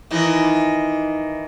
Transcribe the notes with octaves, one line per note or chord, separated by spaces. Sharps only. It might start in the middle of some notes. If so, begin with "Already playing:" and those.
D#3 E3 D#4